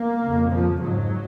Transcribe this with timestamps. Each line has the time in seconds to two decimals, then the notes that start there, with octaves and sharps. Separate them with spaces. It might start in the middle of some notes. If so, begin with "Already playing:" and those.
Already playing: A#3
0.24 F2 C#3
0.52 F3
0.82 G#2 F#3